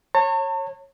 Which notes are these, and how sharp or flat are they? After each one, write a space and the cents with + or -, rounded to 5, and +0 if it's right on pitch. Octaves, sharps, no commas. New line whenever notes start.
C#5 -20 A5 +45